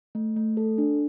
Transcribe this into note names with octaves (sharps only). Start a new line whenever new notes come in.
A3
A3
A4
D4